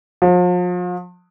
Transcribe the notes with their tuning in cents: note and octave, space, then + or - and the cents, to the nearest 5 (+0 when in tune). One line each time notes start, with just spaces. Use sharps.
F3 +40